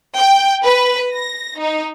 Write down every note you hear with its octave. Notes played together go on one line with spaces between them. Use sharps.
G5
B4
A#6
D#4